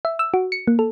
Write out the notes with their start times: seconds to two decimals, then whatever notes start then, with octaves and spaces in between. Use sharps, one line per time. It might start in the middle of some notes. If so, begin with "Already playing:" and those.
0.05 E5
0.19 E6
0.34 F#4
0.52 C#7
0.67 A#3
0.79 A4